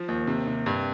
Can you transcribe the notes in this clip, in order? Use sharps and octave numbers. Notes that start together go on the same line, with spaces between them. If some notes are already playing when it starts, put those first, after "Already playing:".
Already playing: F3
D#2
C3
C3
G2